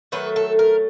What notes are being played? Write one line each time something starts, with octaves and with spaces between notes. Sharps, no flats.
D#3 F#3 A3 B4
A4
A#4